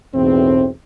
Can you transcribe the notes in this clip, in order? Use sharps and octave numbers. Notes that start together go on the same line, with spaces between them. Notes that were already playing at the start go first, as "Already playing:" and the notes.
B1 E2 A2 C4